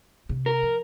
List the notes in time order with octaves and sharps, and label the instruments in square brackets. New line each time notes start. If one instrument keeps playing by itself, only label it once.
[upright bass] C3
[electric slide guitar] A#4
[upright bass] F3